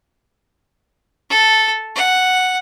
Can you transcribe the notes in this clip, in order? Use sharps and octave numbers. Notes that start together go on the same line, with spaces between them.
A4
F#5